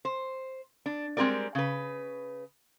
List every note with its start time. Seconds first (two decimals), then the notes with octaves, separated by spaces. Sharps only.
0.05 C5
0.86 D4
1.17 G3 G#3 C4 G4 A#4 D5
1.55 C#3 B4